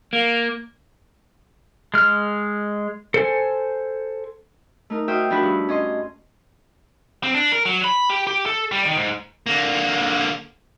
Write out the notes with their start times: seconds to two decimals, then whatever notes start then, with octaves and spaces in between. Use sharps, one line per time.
0.13 A#3
1.94 G#3 F6
3.14 A4 C5 G#5
4.90 A3 D#4 A#4
5.08 F#4 C5 E5 G5 D#6 F6
5.30 F3 D4 E4 F#4 B4 F#6
5.43 G2
5.69 C#4 D#5 C6
7.23 C4
7.35 D4
7.52 A#4
7.65 F#3
7.84 B5
8.10 G4
8.27 G4
8.46 A4
8.72 G3
8.86 D#3
8.97 G#2
9.47 D3 A#3